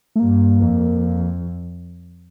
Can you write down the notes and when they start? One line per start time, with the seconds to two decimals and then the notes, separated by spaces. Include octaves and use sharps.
0.15 A3
0.19 G2 A#3
0.60 F2